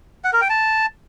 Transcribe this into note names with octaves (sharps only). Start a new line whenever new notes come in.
F#5
A#4
G5
A5